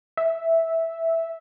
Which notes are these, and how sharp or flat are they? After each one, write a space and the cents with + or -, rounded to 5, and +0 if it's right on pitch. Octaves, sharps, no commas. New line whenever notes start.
E5 -10